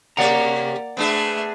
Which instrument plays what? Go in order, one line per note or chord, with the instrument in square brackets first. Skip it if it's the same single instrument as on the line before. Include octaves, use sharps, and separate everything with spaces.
[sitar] C3 G4 [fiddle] A#3 [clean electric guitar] D5 F#5 A#5
[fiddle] A3 E5 [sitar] B3 D4 G#4